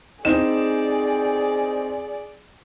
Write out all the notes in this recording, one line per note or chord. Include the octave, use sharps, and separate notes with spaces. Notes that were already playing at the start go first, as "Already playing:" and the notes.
C4 D#4 G#4 D5 E7